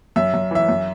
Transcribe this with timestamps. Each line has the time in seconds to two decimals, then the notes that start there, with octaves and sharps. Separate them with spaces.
0.16 F#2 E5
0.34 F#2
0.51 E3 E5
0.69 F#2